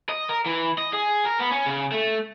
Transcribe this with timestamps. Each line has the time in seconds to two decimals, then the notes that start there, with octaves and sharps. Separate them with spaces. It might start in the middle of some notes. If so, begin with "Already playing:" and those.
0.09 D#5
0.29 A#4
0.46 E3
0.78 D#5
0.93 G#4
1.25 A#4
1.39 B3
1.52 C#4
1.66 C#3
1.92 A3